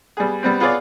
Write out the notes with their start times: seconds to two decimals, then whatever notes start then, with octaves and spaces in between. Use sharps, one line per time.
0.17 G3 B3 G#4
0.43 G3 B3 C4
0.60 B3 F4 G#4 C#5 D5